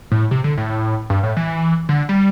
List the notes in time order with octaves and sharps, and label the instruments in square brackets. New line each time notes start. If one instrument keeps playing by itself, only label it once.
[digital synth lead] A2
C3
D3
A2
G2
A2
E3
D3
G3